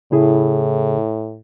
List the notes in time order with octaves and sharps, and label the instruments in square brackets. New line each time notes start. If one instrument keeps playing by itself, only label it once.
[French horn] A2 [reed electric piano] C#3 E4 G#4